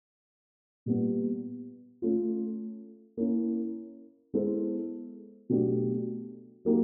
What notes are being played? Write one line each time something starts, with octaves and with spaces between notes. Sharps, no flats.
A#2 G3 B3
A3 C#4 F4
A#3 C#4 E4
G#3 B3 E4 A4 C5
B2 F#3 A3 D4 G4
F#3 A#3 D#4 G4